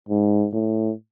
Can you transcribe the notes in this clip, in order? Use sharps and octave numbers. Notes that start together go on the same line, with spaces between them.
G#2
A2